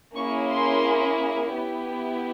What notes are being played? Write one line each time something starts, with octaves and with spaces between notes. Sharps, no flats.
A#3 C#4 E4 G#4 C#6
C6
B3 E4 G4